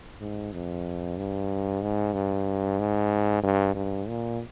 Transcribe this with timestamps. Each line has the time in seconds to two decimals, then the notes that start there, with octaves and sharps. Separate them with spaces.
0.20 G#2
0.53 F2
1.17 G2
1.82 G#2
2.14 G2
2.79 G#2
3.43 G2
3.75 G2
4.08 A#2